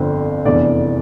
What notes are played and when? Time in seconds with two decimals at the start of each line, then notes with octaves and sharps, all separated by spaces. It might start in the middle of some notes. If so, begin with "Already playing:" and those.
Already playing: G1 F2 D3 C4 C5
0.45 F1 E2 E3 D4 D5